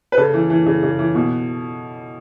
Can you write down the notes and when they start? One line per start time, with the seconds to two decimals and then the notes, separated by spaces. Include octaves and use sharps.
0.12 B4
0.17 C#3 A4
0.34 E3
0.50 E3
0.66 C#3
0.83 C#3
0.99 E3
1.15 B2